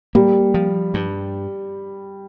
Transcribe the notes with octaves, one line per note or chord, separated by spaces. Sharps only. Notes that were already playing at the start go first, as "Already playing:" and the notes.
G3 A#3
F3
G2